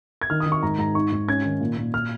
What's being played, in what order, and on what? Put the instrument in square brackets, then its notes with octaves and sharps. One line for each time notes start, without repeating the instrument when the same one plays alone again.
[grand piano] G#6
D#3 F6
D#6
D#3
C#6
G#2 A#5
G#2 A#5
D#4 C#6
G#2
C#4 G#6
D#3
A#2
A#2
F6